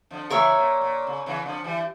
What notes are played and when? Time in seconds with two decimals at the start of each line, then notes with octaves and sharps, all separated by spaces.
0.11 D3 F3
0.30 C#3 E3 A#4 C#5 E5
0.56 A#2
0.81 A#2
1.07 C#3
1.26 C#3 E3
1.46 D3 F3
1.64 E3 G3